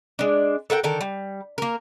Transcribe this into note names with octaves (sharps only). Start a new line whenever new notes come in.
G#3 D4
A4 A#4 F#5 G5
D3 D#3 A4 A#4
G3
A#3 A#4